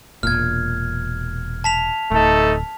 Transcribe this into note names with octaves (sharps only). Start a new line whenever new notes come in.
E1 A#2 F6 G#6
A5 B6 F7
D1 A3 D#4 A4